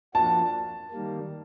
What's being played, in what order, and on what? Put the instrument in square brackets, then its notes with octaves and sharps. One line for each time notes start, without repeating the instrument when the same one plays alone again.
[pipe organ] F3 A#3 D4 F#4 [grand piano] A5
[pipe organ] D#3 G3 A#3